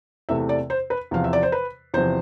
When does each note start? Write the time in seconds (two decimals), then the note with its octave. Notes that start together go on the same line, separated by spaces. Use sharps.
0.29 E2 C3 E3 A3 E5
0.49 D5
0.70 C5
0.90 B4
1.11 E2 C3 F3 F5
1.24 E5
1.33 D5
1.43 C5
1.52 B4
1.94 E2 C3 F3 C5